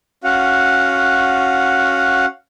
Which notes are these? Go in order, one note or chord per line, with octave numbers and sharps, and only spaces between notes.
C#4 F#4 F5 F#5